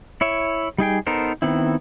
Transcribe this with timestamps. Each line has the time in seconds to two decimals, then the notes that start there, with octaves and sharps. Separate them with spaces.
0.21 E4 C#5 E5
0.78 G3 D#4 G#4 G5
1.07 B3 D#4 A4 A#4 C5
1.42 D#3 B3 C4 E4